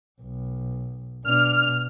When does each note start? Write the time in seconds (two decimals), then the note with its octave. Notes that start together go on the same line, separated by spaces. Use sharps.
0.21 B1
1.25 B2 D4 F6